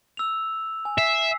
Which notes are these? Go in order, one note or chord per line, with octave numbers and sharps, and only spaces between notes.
E6 F7
G#5
E5 E6 B6 C7